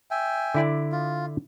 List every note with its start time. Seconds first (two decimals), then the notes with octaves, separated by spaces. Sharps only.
0.11 E5 G5 G#5
0.55 D3 E4 D5
0.92 F4